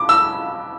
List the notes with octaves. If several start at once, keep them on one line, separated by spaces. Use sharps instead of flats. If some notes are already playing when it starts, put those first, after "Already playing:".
Already playing: D6
E6